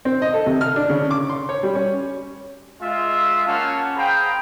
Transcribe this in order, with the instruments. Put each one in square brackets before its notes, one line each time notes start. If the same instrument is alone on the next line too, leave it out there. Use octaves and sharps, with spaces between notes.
[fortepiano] C4
D#5
A4
C3
F6
D4
C#3
D6
C6
C#5
G3
C#4
[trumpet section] G#3 F4 E5
A#3 C#4 F5 F#5 A5
G#4 C5 F5 G5 A#5 B5